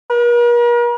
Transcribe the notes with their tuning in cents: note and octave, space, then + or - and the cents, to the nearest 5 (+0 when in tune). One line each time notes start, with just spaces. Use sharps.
A#4 +45